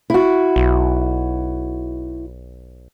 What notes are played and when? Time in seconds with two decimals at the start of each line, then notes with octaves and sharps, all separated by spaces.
0.10 E4 F#4
0.56 B1